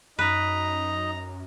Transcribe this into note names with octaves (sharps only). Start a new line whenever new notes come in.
F#2 D#4 B4 D#5 A#5